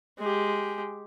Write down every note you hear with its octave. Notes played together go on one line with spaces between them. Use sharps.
G#3 G4